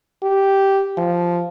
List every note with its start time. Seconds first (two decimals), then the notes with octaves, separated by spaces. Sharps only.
0.23 G4
0.97 F3